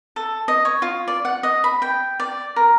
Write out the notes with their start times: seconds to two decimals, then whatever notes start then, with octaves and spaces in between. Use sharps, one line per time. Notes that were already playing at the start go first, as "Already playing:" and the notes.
0.16 A4
0.48 D#5
0.65 C#5
0.82 F4
1.07 D5
1.25 F#5
1.43 D#5
1.64 B5
1.82 G5
2.20 D5
2.56 A#4